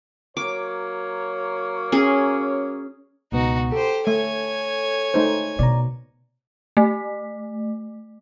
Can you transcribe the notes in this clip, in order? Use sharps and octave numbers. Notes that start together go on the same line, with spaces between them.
F#3 A#3 C#5 D6
C#4 G#4
C#2 B2 B3 D#4 F#4
G4 A4 C5
A3 C#5 G#5
A3 D#4 C5
B2 D5 A#5
A3